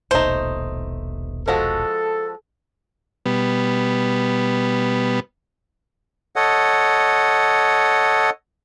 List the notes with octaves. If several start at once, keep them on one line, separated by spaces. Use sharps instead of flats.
D#1 A#1 B2 A3 D#4 C5
F3 G#3 F#4 A4
B2 G3 B3
A4 C#5 D#5 F#5